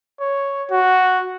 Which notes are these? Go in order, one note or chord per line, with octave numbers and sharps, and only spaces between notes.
C#5
F#4